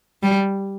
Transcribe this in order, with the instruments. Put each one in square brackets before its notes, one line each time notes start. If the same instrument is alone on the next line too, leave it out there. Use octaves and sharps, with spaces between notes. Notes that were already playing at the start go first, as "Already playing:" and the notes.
[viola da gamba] G3